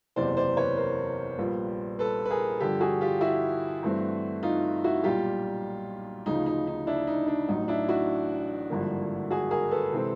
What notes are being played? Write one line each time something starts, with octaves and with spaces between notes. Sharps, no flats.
F#1 E2 C3 E3 C5 D5
C5 D5
B4 C#5
A#4 C5
A#1 A#2 G3 B3
A4 B4
B4
G#4 A#4
G2 D3 F3 G4 A4
F#4 G#4
F4 G4
E4 F#4
G2 E3 A3 C4
D#4 F4
E4 F#4
B1 A#2 G3 F4 G4
D2 C#3 F3 D#4
D#4
D#4
D4 E4
D#4
D4
A1 A2 F#3 D#4
D4 E4
E4 F#4
G#1 G2 D3 F3 A#3
F#4 G#4
G#4 A#4
A4 B4
C3 E3 G#3 C4